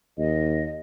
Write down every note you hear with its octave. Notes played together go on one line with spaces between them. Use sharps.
D#2 D#5